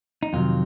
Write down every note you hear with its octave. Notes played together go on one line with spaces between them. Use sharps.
D#4
F2 C3 D#3 F#3 F4